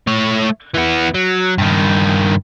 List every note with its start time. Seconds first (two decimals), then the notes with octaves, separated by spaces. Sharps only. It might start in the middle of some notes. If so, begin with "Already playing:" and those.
0.07 A3 C#5
0.74 E3 B3
1.15 F#3
1.58 G2 D#3